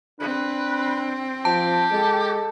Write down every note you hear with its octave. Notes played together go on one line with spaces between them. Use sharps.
C4 D4 B4
F3 G4 A5
G#3 A4